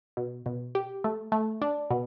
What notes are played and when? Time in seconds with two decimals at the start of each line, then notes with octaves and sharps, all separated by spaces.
0.17 B2
0.46 B2
0.75 G4
1.04 A3
1.32 A3
1.62 D4
1.91 B2